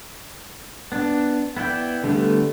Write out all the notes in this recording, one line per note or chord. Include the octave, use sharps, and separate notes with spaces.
B3 D4
B3 E4 D5 G5
D3 G3 A3 B3